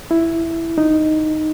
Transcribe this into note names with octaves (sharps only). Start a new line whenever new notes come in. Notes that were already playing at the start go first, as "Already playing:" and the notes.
E4
D#4